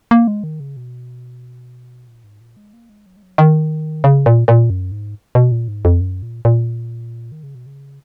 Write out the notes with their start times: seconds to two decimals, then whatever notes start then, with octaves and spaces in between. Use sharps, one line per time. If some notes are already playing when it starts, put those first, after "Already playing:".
0.11 A#3
0.27 G#3
0.44 D#3
0.60 C#3
0.77 B2
2.07 A#2
2.24 G#2
2.41 A#2
2.57 G#3
2.73 A#3
2.89 G#3
3.06 F#3
3.17 G#3
3.23 F#3
3.38 D#3
4.04 C#3
4.26 A#2
4.48 A#2
4.70 F#2
4.92 G#2
5.35 B2
5.52 A#2
5.68 G#2
5.85 F2
6.01 F#2
6.22 A#2
6.45 A#2
7.32 D#3
7.43 C#3
7.55 B2
7.66 C#3